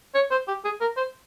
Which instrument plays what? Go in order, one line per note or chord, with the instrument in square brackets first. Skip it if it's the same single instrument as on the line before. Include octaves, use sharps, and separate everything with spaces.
[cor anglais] C#5
C5
G4
G#4
A#4
C5